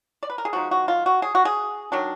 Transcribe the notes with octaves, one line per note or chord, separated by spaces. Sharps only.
D5
B4
A#4
G#4
F3 G#3 D#4 F#4
F#4
F4
F#4
G#4
F#4
G#4
D#3 F#3 D4